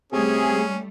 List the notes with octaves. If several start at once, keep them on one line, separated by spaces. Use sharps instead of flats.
C3 G3 A3 C#4 G#4